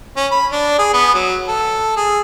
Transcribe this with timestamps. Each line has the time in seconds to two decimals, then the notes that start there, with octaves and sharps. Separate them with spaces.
0.17 C#4
0.31 B5
0.52 D4
0.79 G#4
0.94 B3
1.14 F#3
1.48 A4
1.97 G#4